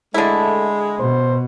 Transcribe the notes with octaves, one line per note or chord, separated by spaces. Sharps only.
D3 G#3 A3 E4
B2 C5